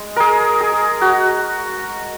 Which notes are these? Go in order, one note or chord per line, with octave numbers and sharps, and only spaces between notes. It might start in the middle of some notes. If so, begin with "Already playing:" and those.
Already playing: G#3
G#4 A#4
G#4
F#4